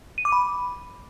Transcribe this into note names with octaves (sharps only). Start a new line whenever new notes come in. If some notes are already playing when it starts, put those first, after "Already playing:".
D#7
D6
B5